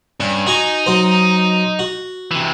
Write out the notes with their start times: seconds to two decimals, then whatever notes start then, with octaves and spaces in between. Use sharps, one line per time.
0.20 G2 C#4
0.47 D#4 F#4 G#5 C#6
0.86 F#3 C5
1.79 F#4
2.31 C3 E3